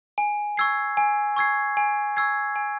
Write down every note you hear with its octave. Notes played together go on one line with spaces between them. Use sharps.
G#5
C#6 E6 G#6 C7
G#5
C#6 E6 G#6 C7
G#5
C#6 E6 G#6 C7
G#5